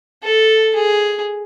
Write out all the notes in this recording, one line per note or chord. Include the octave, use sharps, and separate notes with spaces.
A4
G#4